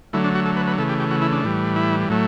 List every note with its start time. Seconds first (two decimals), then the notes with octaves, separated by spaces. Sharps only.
0.13 D3 F#3 A3 E4
0.24 D4
0.35 F#4
0.46 A4
0.57 B4
0.67 B4
0.78 C#3 E3 A3 A4
0.89 G4
1.00 G4
1.11 F#4
1.22 E4
1.33 D4
1.44 A2 E3 G3
1.76 E4
2.09 A2 F#3 A3